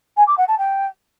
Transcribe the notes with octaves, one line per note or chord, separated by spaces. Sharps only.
G#5
D6
F#5
A5
G5